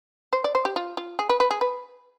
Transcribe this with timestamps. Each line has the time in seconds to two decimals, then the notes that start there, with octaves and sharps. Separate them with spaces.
0.33 C5
0.44 D5
0.55 C5
0.65 G4
0.76 F4
0.97 F4
1.19 G#4
1.29 B4
1.40 B4
1.51 G#4
1.61 B4